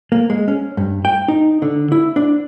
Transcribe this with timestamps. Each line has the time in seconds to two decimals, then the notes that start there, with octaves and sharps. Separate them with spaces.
0.12 A#3
0.30 G#3
0.48 C#4
0.77 G2
1.05 G5
1.28 D#4
1.62 D3
1.92 E4
2.16 D4